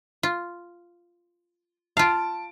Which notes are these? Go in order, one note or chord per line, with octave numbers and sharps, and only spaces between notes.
F4
F4 F5 A5 D7